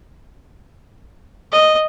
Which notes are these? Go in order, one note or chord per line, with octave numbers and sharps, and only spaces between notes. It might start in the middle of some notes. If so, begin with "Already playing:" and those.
D#5